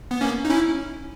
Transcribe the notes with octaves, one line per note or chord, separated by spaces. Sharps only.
B3
A#3 C#4
D#4
C#4 E4